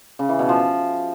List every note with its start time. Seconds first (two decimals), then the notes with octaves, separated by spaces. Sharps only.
0.19 C#3
0.29 E3
0.39 B2
0.49 F3